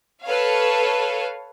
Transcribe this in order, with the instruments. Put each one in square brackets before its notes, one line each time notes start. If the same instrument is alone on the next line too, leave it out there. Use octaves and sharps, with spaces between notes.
[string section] A4 B4 C#5 F5